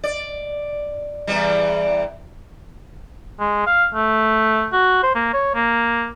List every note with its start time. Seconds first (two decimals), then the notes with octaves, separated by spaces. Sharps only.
0.04 D5
1.27 E2 E3 G3
3.40 G#3
3.67 F5
3.95 A3
4.73 F#4
5.03 C5
5.15 A#3
5.33 C#5
5.55 A#3